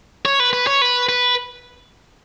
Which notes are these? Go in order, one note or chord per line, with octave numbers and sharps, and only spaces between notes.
C#5
B4
B4
C#5
B4
B4